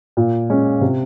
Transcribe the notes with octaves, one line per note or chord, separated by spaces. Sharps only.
A#2
G#3 C#4
C3